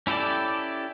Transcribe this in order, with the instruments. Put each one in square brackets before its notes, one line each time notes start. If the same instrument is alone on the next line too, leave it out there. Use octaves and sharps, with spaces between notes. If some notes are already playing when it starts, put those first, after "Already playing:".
[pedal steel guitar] C#4 E4 G4 A4 D5